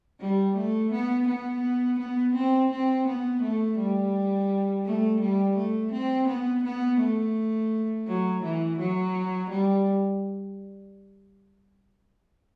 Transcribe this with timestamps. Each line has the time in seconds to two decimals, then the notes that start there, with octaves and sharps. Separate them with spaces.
0.20 G3
0.56 A3
0.92 B3
1.27 B3
1.99 B3
2.35 C4
2.71 C4
3.07 B3
3.42 A3
3.78 G3
4.85 A3
5.21 G3
5.57 A3
5.92 C4
6.28 B3
6.64 B3
7.00 A3
8.07 F#3
8.43 E3
8.79 F#3
9.50 G3